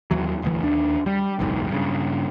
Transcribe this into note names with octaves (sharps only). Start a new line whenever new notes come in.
D#2 E3 F#3
E1 D2 E3
D#2 D4
G3
F#1 B1 E2 G#2
G2 C#3